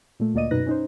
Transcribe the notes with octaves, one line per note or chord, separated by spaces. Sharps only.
A#2 A3
D2 A#2 A#3 D5 D#5 D#7
F#2 B2 D#4 B4 F#6 A#6
C#4 D#4 C5